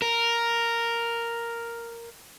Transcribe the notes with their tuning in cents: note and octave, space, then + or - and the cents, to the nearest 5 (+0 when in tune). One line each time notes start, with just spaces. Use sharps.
A#4 +0